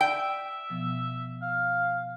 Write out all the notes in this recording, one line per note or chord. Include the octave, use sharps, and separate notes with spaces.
D5 E5 G5
B2 F3 B3
F5